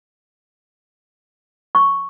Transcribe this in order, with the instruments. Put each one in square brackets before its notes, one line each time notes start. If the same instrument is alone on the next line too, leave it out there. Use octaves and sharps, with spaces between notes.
[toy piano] C#6